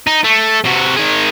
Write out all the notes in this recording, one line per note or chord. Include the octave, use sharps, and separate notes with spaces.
D#4
A3
C3 F#4
D#3 G#4